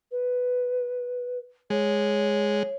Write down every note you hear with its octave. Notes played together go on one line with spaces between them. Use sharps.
B4
G#3 C#5